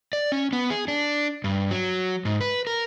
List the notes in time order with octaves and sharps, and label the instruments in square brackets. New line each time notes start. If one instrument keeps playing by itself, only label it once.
[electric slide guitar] D5
C#4
B3
G#4
D4
G2
F#3
G#2
B4
A#4